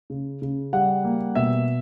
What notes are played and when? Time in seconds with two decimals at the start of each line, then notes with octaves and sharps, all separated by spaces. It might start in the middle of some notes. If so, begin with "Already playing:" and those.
0.10 C#3
0.42 C#3
0.73 G3 F#5
1.04 A#3
1.35 B2 E5